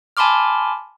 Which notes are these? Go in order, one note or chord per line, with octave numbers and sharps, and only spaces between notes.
G#5 A5 B5 C6 D6 F6